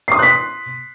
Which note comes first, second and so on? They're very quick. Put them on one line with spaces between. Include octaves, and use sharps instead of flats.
C7 D#6 C6 F#6 B6